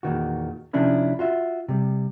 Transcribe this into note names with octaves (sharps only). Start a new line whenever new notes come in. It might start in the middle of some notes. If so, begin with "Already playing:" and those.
E2 A#2 D#3 F#4
C3 F3 C#4 D4 E4 A#4
F4 F#4 E5
C3 G3